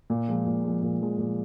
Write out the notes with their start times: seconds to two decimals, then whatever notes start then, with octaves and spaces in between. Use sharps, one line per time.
0.10 A#2
0.29 F3 G#3
0.46 A#2
0.64 F3 G#3
0.83 A#2
1.01 F3 G#3
1.19 A#2